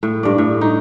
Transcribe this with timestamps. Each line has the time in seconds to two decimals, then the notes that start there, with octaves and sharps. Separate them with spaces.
0.03 A2
0.23 G2 D5
0.38 A2
0.61 D#4